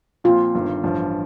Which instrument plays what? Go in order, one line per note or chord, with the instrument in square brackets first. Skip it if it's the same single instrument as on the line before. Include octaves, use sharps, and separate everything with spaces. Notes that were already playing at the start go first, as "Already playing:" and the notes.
[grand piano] A#2 F3 C4 [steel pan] F4
[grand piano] G1 G2 D#3
A1 G2 F3